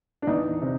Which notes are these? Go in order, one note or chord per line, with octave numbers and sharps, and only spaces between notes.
D4
E2 D#4
C3